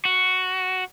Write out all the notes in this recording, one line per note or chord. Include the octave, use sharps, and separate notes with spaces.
F#4